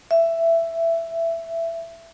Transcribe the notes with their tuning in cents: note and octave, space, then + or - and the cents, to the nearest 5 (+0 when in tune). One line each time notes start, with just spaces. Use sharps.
E5 +10